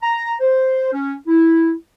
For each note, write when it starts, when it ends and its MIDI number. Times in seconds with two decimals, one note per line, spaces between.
0.03 0.33 82
0.41 0.91 72
0.93 1.13 61
1.27 1.73 64